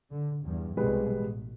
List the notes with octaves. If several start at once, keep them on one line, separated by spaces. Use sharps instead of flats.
D3
E2 G2
C2 B2 G3 G#3 B4
A1